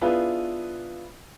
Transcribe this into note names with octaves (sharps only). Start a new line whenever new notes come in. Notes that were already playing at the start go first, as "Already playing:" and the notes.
B3 D4 E4 F4 G#4 B4